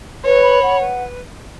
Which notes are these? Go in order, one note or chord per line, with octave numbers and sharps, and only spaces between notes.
B4 C#5
B5
F#5
B4